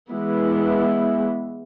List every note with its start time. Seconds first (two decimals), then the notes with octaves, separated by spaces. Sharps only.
0.11 E3 G#3 B3 E4